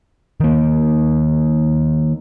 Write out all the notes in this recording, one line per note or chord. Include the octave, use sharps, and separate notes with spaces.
D#3 A#3